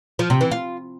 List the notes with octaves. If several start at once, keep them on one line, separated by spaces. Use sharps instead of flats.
F3
C3
E3
F4